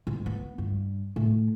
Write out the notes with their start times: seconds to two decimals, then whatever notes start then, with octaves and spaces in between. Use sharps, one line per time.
0.07 G#2
0.26 B3
0.58 G2
1.16 A2